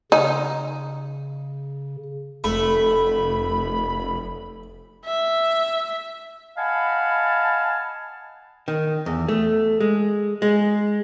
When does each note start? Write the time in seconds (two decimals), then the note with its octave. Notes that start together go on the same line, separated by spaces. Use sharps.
0.12 C#3 D#4
2.44 F1 A3 B5
5.06 E5
6.57 D#5 F5 F#5 G#5 A5 B5
8.68 D#3
9.06 E2
9.28 A3
9.80 G#3
10.42 G#3